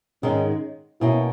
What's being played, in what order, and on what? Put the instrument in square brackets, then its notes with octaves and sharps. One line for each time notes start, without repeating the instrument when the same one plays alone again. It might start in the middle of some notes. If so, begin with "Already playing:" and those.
[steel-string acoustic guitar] G#2 D#3 G#3 [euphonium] C#4
[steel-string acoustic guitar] B2 A#3 C#4 [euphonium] E4